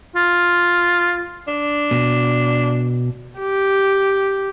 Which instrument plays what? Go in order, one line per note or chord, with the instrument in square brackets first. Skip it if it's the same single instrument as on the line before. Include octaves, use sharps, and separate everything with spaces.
[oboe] F4
[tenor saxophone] D4
[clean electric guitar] B2
[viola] G4